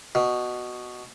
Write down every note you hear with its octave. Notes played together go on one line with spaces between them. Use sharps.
B2